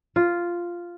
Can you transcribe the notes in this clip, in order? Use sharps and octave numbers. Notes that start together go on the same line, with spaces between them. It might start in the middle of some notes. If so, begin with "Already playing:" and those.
F4